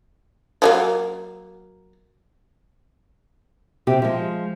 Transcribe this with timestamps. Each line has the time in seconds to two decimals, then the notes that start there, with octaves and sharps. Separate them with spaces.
0.62 F3 F#3 A#3
3.87 C3 C4 G4
4.02 F3 G#3